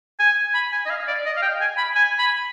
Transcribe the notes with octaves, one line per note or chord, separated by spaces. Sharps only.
G#5
B5
G#5
D#5
F5
D5
D#5
F5
G5
G#5
B5
G#5
B5